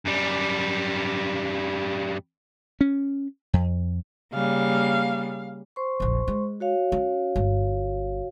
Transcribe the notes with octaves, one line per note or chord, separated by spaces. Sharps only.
F#2 G3
C#4
F2
C#3 G3 A#3 F5
C5 C6 C#6
F1 A#1
G#3
F#4 C#5 F5
C#4
G1